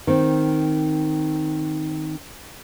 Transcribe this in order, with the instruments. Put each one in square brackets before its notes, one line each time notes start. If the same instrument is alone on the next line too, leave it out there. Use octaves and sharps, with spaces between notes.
[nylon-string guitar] D#3 C4